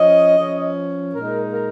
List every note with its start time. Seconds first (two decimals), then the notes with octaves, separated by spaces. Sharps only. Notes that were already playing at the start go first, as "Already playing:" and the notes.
Already playing: F3 C#4 D#5
0.37 F3 C#4
1.15 A#2 G#3 D#4 A#4
1.53 A#4